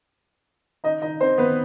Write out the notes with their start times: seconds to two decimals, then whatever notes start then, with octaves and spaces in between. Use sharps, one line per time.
0.84 D#4 D#5
1.02 D#4 D#5
1.21 C4 C5
1.38 B3 B4